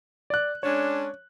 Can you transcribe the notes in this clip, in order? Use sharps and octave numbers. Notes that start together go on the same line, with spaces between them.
D5 F#6
G#3 C#4 D4 C#5